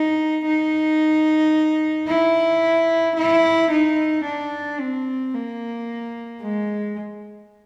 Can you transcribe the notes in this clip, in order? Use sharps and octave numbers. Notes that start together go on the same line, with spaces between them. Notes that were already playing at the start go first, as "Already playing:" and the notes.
Already playing: D#4
D#4
E4
E4
D#4
D4
C4
A#3
G#3